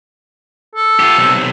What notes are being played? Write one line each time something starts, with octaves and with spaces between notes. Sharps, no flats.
A4
F4 G4
B1 C3